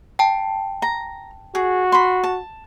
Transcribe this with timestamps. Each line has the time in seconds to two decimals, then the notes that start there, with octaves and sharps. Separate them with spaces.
0.19 G5 A5
0.82 A#5
1.55 F#4 G#4
1.92 B5 C6
2.24 A5